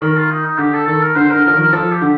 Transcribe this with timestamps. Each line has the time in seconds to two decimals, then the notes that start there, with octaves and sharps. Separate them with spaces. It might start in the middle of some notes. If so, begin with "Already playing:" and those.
0.02 D#3 A#4
0.16 F4
0.30 D#4
0.44 D#4
0.58 D3 G4
0.74 A4
0.87 D#3 A4
1.01 A#4
1.16 D3 C5
1.30 A#4
1.35 D3
1.45 F3 A#4
1.54 D#3
1.59 A#4
1.72 F3 A4
1.92 G4
2.02 D3